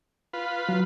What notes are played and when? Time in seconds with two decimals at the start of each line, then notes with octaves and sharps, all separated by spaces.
0.33 F4 B4
0.69 F#3